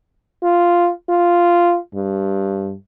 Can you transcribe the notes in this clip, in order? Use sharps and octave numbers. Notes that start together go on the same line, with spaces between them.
F4
F4
G2